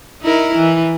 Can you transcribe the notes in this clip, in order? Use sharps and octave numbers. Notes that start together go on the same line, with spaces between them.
D#4 E4 A#4
E3